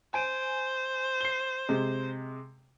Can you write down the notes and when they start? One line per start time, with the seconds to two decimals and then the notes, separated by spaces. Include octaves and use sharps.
0.14 C5 G#5 D7 D#7
1.21 C7 G7
1.69 C3 G#3